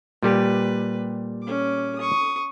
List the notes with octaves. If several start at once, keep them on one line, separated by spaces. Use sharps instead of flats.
A#2 G3 G4 B4
C#4 D6
C#6 D#6